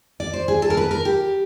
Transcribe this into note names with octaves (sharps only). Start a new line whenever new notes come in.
D5
C5
G#4
A4
A#4
B4
A#4
G4